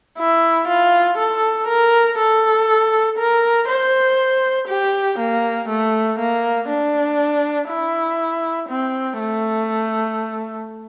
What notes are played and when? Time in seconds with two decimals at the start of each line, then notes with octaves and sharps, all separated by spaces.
0.19 E4
0.68 F4
1.18 A4
1.68 A#4
2.18 A4
3.18 A#4
3.68 C5
4.68 G4
5.19 A#3
5.69 A3
6.19 A#3
6.69 D4
7.69 E4
8.69 C4
9.19 A3